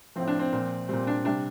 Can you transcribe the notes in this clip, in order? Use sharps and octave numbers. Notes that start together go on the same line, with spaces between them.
A2 F3 C4
D4
C4
A#2 F3
A#2 G3 C4
D4
C3 G3 D4